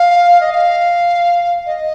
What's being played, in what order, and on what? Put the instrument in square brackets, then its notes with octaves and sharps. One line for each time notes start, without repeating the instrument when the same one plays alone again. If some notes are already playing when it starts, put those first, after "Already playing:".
Already playing: [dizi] F5
D#5
F5
D#5